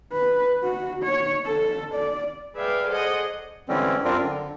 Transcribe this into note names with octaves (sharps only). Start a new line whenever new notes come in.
B4
F#4
C#5
A4
D5
G#4 B4 D5 E5 F5 G5
G#4 A4 C5 D5 D#5 F#5
D3 E3 G3 G#3 C4 C#4
F#2 G3 C4 D4 F4 A#4
D3